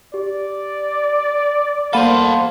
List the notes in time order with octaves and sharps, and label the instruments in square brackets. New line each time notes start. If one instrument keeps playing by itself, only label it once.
[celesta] G4 [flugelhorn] D5
[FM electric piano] A#3 F5 [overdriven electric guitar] A4 C5 [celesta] F#5 B5 D#7